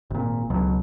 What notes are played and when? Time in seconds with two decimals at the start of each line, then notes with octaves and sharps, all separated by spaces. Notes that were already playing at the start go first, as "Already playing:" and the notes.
0.10 G#1 A#2
0.50 C#2 B2 F#3